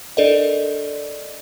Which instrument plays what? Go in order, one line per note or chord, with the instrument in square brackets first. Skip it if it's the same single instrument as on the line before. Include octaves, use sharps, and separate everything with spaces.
[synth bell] D4 A4 A#4 D5 D#5